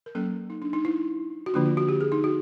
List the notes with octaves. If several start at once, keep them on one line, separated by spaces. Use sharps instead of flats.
A#4
F#3 A#3 C#4 A4
D#4
D4
D#4
E4
F#4
D3 F3 A#3 D4 F4
F4
F#4
G4
G#4
D#4
F#4